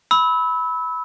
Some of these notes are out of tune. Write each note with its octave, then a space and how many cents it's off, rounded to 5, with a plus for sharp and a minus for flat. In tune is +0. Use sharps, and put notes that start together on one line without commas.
B5 +0 E6 -25